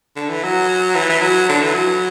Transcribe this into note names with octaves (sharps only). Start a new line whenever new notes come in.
D3
E3
F#3
E3
E3
F#3
D3
E3
F#3